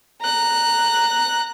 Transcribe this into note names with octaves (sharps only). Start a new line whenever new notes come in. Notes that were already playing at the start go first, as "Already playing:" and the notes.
A#5 F#6